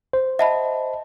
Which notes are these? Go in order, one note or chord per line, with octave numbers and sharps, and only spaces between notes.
C5
D#5 E5 F#5 A5 B5